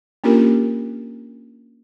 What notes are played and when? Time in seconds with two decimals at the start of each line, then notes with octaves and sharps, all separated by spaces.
0.24 A#3 C#4 D4 F4 G4 A#4